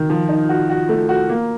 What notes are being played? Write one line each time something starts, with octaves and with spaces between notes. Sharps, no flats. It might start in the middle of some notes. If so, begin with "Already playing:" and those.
Already playing: D#3
F3
D#4
F#4
F#4
A3
F#4
A#3